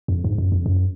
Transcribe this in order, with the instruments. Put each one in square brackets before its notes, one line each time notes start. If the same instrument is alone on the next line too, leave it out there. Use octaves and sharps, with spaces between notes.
[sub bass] F2
G#2
F#2
F2
F#2